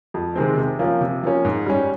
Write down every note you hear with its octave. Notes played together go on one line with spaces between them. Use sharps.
F2
C3 D#3 G#3 C4
C3
F3 A#3 C#4
C3
F3 A#3 C#4
G#2
G3 C#4